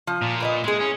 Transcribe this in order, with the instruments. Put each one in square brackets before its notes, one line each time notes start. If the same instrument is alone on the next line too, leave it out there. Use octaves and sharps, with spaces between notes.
[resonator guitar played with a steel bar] F3
[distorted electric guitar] A#2
[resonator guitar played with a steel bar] B4 D5 D#5
[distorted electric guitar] G#3 [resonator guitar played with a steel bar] E4 G#4
[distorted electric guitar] C#4